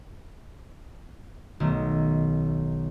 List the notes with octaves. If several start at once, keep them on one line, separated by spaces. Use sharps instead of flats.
B1 D#3 A3